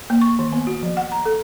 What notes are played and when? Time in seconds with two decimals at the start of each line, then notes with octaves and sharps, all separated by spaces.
0.10 A#3
0.21 C#6
0.39 D#3
0.53 B3
0.67 F#4
0.83 F3
0.97 F#5
1.12 A#5
1.25 A4